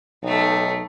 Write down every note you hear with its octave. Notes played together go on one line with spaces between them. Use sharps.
B1 A3 D#4